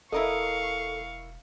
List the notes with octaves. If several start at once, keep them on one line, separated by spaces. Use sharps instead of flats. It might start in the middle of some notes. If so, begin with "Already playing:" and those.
E1 E4 A4 A#4 D#5 F5 C#6